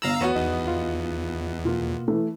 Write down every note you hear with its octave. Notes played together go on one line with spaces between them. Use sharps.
G1 F5 A#5 E6 F7 F#7
E2 B3 F#4 C#5 D#7
E2 D#4 D#5
F4
B2 A#3 F4
E3 A3